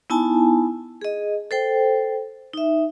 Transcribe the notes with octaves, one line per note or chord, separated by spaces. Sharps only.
B3 D#4 E4 G#5 A5
G#4 D#5
A4 C5 G5
D#4 E5